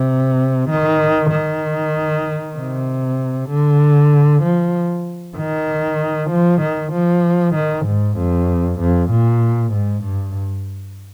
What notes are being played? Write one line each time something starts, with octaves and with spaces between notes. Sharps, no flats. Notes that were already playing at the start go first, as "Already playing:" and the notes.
Already playing: C3
D#3
D#3
C3
D3
F3
D#3
F3
D#3
F3
D#3
G#2
F2
F2
A#2
G#2
G2